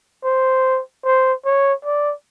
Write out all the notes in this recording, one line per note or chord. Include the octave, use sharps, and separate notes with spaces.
C5
C5
C#5
D5